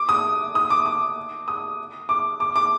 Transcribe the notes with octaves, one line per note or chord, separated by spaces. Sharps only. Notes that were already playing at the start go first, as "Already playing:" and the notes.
Already playing: D6
D#6
D#6
D6
D6
D#6
D6
D6
D6